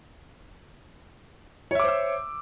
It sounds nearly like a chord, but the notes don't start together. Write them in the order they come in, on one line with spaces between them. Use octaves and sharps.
C#5 E5 D6 C5 E6